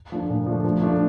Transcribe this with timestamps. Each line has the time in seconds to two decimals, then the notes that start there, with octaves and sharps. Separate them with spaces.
0.12 F3 A3 D4
0.30 A#2
0.46 F3 A3 D4
0.65 F3
0.82 A3 D4 F4